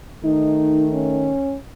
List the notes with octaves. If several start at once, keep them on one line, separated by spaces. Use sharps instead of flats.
D#3 A3 D#4
C#4